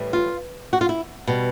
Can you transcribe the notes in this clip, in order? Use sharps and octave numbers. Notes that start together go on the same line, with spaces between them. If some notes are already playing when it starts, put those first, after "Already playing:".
Already playing: A2 E3 G3
F4
F#4
F4
E4
B2 G3